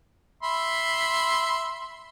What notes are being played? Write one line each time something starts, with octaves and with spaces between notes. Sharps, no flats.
E5 B5 C6